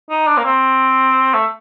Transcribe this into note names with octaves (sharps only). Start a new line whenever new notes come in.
D#4
D4
A#3
C4
A3